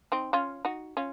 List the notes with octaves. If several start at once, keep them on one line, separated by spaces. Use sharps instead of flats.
C4 D#4
C#4 F4
D#4 F#4
C#4 F4